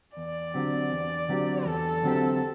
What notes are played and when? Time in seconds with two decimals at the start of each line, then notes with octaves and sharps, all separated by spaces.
0.17 E2 D5
0.54 D3 F#3 C4 G4
0.91 E2
1.29 D3 F#3 C4 G4
1.65 E2 A4
2.03 D3 F#3 C4 G4